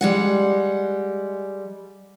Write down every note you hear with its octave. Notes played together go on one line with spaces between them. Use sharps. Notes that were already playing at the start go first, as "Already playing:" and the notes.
G3 G#3 F#5